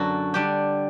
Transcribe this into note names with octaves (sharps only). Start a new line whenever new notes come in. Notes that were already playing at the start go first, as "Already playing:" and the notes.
Already playing: F#2 D3 F#3 F#4 A4 B4
D3 G3 D4 G4